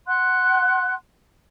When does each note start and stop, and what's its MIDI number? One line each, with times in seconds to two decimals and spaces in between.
0.07 0.93 78
0.07 0.93 84
0.07 0.93 90